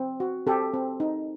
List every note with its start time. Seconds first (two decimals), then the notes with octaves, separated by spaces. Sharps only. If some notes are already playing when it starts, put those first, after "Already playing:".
Already playing: C4
0.20 F#4
0.47 C4 G4 A4
0.74 C4
1.00 D#4